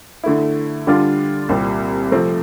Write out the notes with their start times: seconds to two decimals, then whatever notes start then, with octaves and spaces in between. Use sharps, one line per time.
0.23 D3 A3 E4
0.87 D3 G3 D4 F4
1.49 C2 A#2 G3 C4
2.12 C3 F3 A3 C4